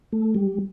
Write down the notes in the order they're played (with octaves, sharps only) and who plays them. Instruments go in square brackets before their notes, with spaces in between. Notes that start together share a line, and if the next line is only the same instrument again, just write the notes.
[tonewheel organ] A3
G3